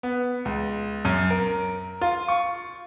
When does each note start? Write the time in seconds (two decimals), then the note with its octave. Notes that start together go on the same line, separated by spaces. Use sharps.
0.03 B3
0.45 C#2
1.05 F#2
1.30 A#4
2.01 F4
2.29 C#6